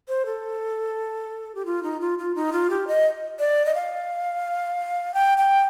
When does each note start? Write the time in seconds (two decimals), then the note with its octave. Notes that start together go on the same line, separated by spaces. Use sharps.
0.08 C5
0.26 A4
1.55 G4
1.65 F4
1.83 D#4
2.00 F4
2.18 F4
2.35 D#4
2.53 F4
2.70 G4
2.87 D#5
3.39 D5
3.66 D#5
3.75 F5
5.14 G5
5.38 G5